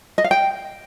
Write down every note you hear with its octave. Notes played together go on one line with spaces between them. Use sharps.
D#5
F5
G5